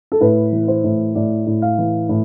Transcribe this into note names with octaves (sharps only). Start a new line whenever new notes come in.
A4
A2 B4
E3
C5
A2
A2 D5
A2
F5
E3
A2